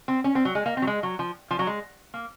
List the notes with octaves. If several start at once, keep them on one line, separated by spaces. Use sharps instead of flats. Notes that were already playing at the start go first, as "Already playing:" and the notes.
C4
C#4
C4
F#3
G#3
A#3
C4
F#3
G#3
F#3
F3
F3
F#3
G#3
A#3